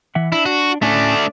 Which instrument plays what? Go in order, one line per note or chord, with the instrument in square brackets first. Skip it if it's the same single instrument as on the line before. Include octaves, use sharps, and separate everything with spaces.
[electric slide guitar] E3 E5 F#5
[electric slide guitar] D4 [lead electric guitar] E4
[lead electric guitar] F#4
[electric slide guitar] A2 C#4 G#5 [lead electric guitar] A3 D4